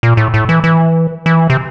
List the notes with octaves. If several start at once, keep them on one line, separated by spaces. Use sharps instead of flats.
A#2
A2
A2
E3
E3
E3
C3